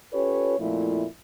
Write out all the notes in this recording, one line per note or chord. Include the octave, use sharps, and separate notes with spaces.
C#4 F4 G4 A4 B4 C#5
F2 A#2 F3 A3 E4